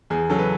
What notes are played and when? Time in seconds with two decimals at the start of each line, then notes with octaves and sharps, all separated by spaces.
0.10 E2 G#4
0.30 C#3 F#3 A4
0.39 B4